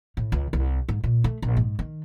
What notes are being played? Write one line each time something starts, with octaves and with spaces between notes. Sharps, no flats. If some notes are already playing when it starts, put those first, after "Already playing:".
A2
C#2
C2
G#2
A#2
A3
A#1
G#2
D#3